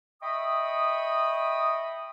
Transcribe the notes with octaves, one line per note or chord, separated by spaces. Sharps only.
D#5 E5 G5 B5 C#6 D#6